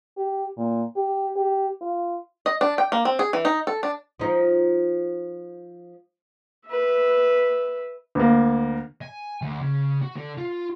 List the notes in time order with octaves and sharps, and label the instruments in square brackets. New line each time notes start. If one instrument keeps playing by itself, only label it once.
[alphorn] G4
A#2
G4
G4
F4
[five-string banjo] D#5
D4
G5
A#3
C4
G#4
E3
D#4
A4
D4
[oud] F3 D#4
[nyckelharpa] B4 E5
[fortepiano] D2 A#3
[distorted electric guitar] G#5
D2
C#3
F#4
D3
F4